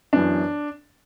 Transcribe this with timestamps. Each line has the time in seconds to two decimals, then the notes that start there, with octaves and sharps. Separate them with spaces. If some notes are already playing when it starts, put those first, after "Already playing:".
0.13 F#2 E3 B3 D4